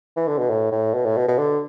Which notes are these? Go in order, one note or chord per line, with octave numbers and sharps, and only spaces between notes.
E3
D3
B2
A2
A2
B2
A2
B2
B2
D3